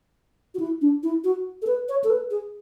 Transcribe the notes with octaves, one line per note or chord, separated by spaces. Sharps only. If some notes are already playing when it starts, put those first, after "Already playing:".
F#4
E4
D4
E4
F#4
A4
B4
C#5
A4
B4
G#4